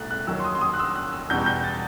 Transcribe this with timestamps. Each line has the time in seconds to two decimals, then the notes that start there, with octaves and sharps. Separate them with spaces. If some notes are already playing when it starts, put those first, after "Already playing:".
Already playing: C2 B2 A3 F#6 A6
0.11 F#6
0.27 D#2 D#3 F#3 E6
0.39 C6
0.45 D#6
0.55 C6
0.61 D#6
0.74 F#6
0.79 E6
0.96 F#6
1.13 E6
1.30 E2 B2 G3 G6
1.46 G6
1.64 A6